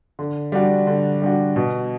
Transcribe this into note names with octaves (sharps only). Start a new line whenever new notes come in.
D3
G3 D4 F#4
D3
G3 D4 F#4
B2